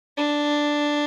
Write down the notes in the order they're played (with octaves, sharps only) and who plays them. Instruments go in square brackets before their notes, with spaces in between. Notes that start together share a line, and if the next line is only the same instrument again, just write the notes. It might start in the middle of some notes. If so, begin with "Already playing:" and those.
[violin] D4